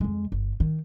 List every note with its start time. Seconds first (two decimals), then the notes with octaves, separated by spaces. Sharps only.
0.01 F2 G#3
0.32 G1
0.60 D#3